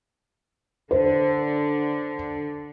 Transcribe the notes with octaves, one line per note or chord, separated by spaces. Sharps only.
D3 C5